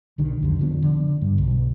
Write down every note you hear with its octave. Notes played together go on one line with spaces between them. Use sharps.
B1 D3 D#3
C2 F2 D3
D3 F3 B3
D3
G2
B1